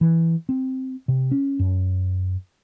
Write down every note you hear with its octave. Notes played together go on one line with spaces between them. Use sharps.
E3
C4
C3
C#4
F#2